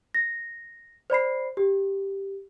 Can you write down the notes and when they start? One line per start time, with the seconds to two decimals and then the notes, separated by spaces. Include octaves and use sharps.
0.15 A#6
1.10 C5 D5 B5 C7
1.57 G4